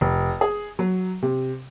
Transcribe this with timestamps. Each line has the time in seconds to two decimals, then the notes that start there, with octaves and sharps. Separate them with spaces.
0.01 F1
0.41 G#4
0.79 F#3
1.22 C3